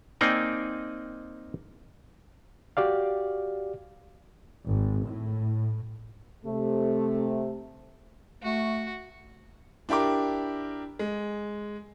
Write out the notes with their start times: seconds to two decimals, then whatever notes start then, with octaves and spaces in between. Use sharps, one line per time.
0.21 A#3 C4 D#4 D5 G5 G#5
2.77 F#4 G4 D5 F5
4.66 G#1
5.05 A2
6.45 C3 A3
8.43 A3 F#4
9.89 D4 E4 G4 A#4 D6
10.99 G#3